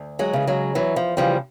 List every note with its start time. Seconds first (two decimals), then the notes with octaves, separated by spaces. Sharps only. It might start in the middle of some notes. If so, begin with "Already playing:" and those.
Already playing: D2
0.19 F#3 G#3
0.33 C#3 E3
0.47 F#3 G#3
0.75 E2 E3 F#3
0.96 F3
1.17 C#3 E3 F3 G3